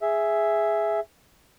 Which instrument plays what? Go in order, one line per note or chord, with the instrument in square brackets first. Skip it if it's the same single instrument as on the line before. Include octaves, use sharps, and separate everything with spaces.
[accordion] G#4 E5